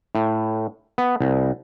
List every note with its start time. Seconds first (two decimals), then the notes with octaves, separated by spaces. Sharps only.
0.15 A2
0.98 B3
1.21 C2